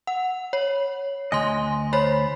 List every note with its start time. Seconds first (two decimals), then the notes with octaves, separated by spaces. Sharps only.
0.07 F#5
0.53 C#5
1.32 D2 D#5 G#5 C6
1.93 C5 C#5 B5